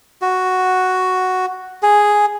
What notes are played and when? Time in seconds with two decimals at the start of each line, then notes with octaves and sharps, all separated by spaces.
0.22 F#4
1.83 G#4